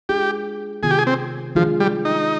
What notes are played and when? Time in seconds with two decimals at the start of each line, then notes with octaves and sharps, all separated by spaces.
0.09 G#3 D4 F4 G4 G#4
0.83 C3 D#3 B3 F4 G#4
0.91 G4
0.99 G#4
1.07 C4
1.55 D#3 F3 G#3 D4 F4 G#4
1.80 G3
2.05 D#4